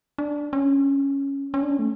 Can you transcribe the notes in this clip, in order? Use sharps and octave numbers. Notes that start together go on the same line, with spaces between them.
D4
C#4
C#4
D4
C#4
A3